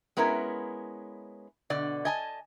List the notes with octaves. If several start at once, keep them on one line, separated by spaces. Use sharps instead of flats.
G#3 B3 C#4 E4 A#4
B2 D3 D5
D#5 G#5 A5